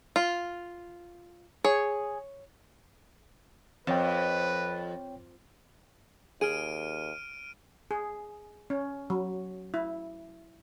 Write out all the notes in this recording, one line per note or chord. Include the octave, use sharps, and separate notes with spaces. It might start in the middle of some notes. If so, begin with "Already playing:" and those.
F4
G#4 C#5
F2 C4 B4 C#5 G5
D#2 G#4 F6 D7 D#7
G#4
C#4
F#3
E4